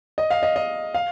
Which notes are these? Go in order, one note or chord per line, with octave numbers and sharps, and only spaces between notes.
D#5
F5
D#5
D#5
F5